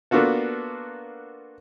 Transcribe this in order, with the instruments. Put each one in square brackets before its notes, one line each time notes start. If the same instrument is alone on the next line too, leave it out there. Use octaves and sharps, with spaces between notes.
[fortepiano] A#3 B3 D4 F4 F#4 A4